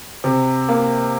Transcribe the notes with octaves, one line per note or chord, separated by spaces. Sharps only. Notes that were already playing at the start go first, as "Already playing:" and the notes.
C3
A#3